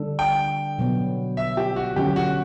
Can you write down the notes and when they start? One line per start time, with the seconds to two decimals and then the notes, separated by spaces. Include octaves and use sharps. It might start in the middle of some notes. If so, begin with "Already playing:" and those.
Already playing: D3 G3 D4 A4
0.19 G5
0.78 B2 F#3 B3
1.37 E5
1.57 G4
1.76 F#4
1.96 D3 F#3 C#4 G4
2.16 F#4